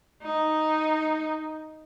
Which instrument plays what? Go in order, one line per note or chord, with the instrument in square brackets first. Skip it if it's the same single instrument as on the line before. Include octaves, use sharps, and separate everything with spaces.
[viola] D#4